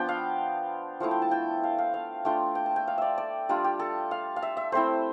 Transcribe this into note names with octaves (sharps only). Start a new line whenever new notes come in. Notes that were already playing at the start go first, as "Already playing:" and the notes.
Already playing: F3 B3 D4 G5
F5
F3 A3 E4 F5
G5
A5
G5
F5
F5
F5
A3 D4 F4 G5
G5
A5
G5
F5
D5 E5
D5
G3 D4 F4
G4
A4
F5
F5
E5
E5
A3 C4 E4 C5